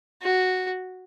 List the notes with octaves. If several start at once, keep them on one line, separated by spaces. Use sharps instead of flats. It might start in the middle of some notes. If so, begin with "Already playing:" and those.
F#4